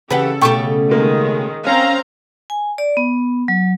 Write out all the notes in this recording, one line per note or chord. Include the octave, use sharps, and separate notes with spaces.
C#3 E3 G4 A4 B4 F#5
B2 A3 G4 G5 C#6
D#3 G#3 A#3
C4 C#4 F5 A#5
G#5
D5
B3
F#3